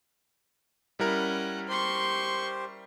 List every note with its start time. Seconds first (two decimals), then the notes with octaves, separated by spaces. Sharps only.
0.99 G3 C#4 E4 A#4 F#5
1.68 G4 C5 C6 C#6